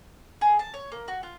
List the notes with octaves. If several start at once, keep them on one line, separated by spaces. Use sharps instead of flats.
G#4
A5
C#5
A#3
F#4
F4